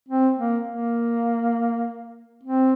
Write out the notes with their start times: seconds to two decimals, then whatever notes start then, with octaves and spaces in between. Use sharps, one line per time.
0.09 C4
0.38 A#3
0.68 A#3
2.43 C4